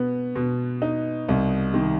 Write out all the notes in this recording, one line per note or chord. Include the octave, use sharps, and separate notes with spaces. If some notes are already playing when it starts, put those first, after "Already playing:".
Already playing: B2 B3
B2
D#4
C2
D#3